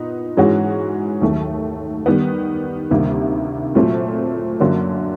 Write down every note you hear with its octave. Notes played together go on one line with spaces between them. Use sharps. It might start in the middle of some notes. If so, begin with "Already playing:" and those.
Already playing: A#2 B3 D#4
G#2 E3 G#3 C#4 F#4
D#2 D#3 F#3 A3
D#3 G3 B3
D2 C3 D#3 G3 A#3
A#2 F#3 A3 C4
F#2 D3 F#3 A#3